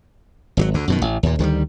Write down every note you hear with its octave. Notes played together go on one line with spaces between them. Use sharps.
G#1 D#3 F#3
D2 D3
F#2 B2 D#3
A1
D#2 A#2
D2 D#3 F#3 G3